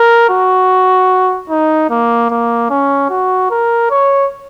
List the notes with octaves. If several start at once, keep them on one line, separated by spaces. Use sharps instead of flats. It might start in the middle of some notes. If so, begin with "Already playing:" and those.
Already playing: A#4
F#4
D#4
A#3
A#3
C#4
F#4
A#4
C#5